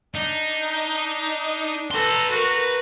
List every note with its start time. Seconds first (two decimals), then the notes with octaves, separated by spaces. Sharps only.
0.15 D4 D#4
1.91 A4 B4 A#5 C6
2.30 F#4 A#4